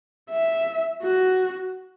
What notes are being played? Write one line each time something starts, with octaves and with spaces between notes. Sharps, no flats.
E5
F#4